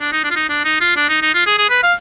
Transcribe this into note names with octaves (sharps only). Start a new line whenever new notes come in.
D4
D#4
D4
F4
D#4
D4
D#4
F4
D4
D#4
D#4
F4
G#4
G#4
B4
F5